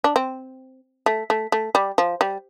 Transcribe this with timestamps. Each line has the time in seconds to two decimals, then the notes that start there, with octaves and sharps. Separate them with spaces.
0.04 D4
0.16 C4
1.06 A3
1.30 A3
1.52 A3
1.75 G3
1.98 F3
2.21 G3